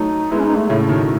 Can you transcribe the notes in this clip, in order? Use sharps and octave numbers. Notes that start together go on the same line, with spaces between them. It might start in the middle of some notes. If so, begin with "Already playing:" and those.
Already playing: F#3 A3 D#4
G#3 B3 E4
C#4
D#4
A3
A2 C#3 A3
B2 D#3